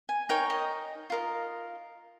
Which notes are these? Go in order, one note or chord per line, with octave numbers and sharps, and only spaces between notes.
G#5
D#4 A#4 C#5 G5
D#5
F4 A#4 D#5